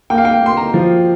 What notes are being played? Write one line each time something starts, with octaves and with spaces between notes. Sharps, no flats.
A#3 G5
F5
G5
A#3 C6
A#5
F3